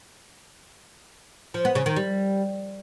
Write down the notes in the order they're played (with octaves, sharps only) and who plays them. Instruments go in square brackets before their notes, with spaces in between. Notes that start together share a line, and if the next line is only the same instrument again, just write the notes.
[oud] F3
B3
C#3
D#3
G3